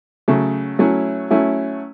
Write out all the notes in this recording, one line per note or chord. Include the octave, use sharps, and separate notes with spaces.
C#3 F#3 A3
F#3 A3 C#4 E4
F#3 A3 C#4 E4